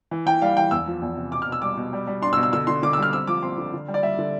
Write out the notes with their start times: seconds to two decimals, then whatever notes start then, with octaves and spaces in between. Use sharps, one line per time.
0.11 E3
0.26 E3 G5
0.42 G3 F5
0.57 E3 G5
0.71 E2 E6
0.87 F3
1.02 E2
1.17 C3
1.32 B2 D6
1.42 F6
1.48 B2 E6
1.62 G3 D6
1.77 B2
1.93 G3
2.07 G3
2.22 D4 C6
2.33 E6
2.37 B2
2.43 E6
2.53 D3 E6
2.67 D3 C6
2.83 D3 D6
2.93 E6
2.98 G3 F6
3.13 C4 E6
3.27 F3 D6
3.43 C4 C6
3.58 D3
3.74 D3
3.88 G3
3.94 D5
4.03 G3 E5
4.18 D3